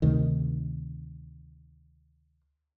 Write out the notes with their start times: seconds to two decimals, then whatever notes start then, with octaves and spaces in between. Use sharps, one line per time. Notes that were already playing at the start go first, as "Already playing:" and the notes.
0.02 D2 C3 D#3